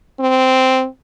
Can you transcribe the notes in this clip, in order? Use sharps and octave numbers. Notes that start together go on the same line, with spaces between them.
C4